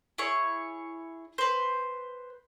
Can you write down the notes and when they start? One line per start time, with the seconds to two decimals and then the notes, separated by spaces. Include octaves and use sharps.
0.18 E4 G#4 C#5
1.38 B4 C5